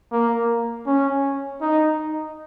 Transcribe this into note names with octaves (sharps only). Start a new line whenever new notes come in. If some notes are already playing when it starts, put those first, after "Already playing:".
A#3
C#4
D#4